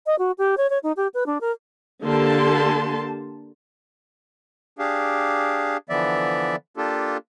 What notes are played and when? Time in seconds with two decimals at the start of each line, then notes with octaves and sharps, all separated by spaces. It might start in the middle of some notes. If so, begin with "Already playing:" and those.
0.06 D#5
0.19 F#4
0.38 G4
0.57 C#5
0.70 C#5
0.83 D#4
0.97 G4
1.14 B4
1.26 D4
1.41 A#4
2.03 D3 A#3 G4 A5 C6
4.79 D4 G4 G#4 F5
5.89 D3 E3 F3 B3 D5 E5
6.77 A#3 D4 F4 G4 A4